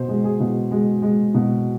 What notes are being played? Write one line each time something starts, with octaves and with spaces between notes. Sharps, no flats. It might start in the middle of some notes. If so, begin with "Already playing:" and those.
Already playing: B2 C5
G#3
G#4
B2
G#3
G#3
B2